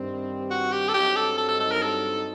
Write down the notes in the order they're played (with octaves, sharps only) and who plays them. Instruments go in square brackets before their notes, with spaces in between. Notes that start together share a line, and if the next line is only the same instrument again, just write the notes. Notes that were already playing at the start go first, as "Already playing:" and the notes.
Already playing: [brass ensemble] G2 D#3 G3 C4
[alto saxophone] F#4
G4
A4
[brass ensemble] G2 F#3 C4 D#4 [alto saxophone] G4
[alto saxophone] A4
A4
A4
A4
A#4
A4